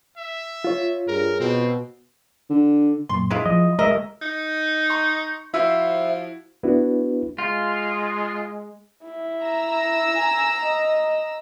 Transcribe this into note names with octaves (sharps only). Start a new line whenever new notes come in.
E5
F4 C#5
G2 G#4 A#4
B2 C4
D3
F#2 A#2 C6
G#3 E4 F4
F3 D#5
G#3 A#4 D#5 E5
D#4
A#5 C6 C#6
F3 E4 F#4 C5 E5 F#5
B3 D4 E4 F#4 B4
G#3 F4
E4
A#5 E6
G#5
D#5